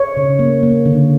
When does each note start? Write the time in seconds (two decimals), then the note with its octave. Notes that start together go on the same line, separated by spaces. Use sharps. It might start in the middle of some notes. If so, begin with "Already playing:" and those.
Already playing: C#5
0.17 C#3
0.39 A#3
0.63 A#3
0.86 D3